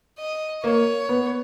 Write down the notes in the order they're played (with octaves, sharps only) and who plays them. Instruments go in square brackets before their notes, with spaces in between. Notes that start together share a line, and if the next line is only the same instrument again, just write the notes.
[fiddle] D#5
[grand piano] A#3 [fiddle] C#5
[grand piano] B3